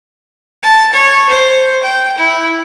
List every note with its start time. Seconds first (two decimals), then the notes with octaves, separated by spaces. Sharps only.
0.63 A5
0.93 C#5
1.29 C5
1.83 G5
2.17 E4